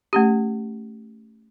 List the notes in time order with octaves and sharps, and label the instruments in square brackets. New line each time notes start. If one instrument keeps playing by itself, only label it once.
[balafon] A3 C#4 G4